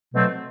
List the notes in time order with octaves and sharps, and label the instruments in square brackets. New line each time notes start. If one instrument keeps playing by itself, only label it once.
[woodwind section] B2 F#3 A3 C4